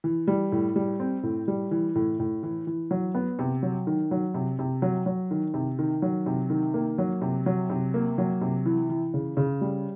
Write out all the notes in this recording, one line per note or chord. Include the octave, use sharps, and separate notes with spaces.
E3
G3
A2
G3
C4
A2
G3
E3
A2
A2
E3
E3
F#3
B3
C3
F#3
D#3
F#3
C3
C3
F#3
F#3
D#3
C3
D#3
F#3
C3
D#3
A#3
F#3
C3
F#3
C3
A#3
F#3
C3
E3
E3
C#3
C#3
G3